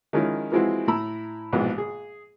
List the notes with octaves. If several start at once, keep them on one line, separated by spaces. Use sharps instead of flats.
D#3 F3 G#3 C#4 D#4 E4
E3 F3 G#3 C4 E4 F#4
A2 E4 A#5 B5 E6
A#1 G#2 B2 E3 F3
G#4